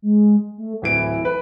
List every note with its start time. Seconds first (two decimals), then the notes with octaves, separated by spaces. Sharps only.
0.02 G#3
0.58 A3
0.82 D1 E3 E4 D7
1.25 B4